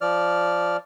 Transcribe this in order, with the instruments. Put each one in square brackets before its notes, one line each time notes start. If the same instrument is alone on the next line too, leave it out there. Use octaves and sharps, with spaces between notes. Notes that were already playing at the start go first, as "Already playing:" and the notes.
[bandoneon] F3 D5 F6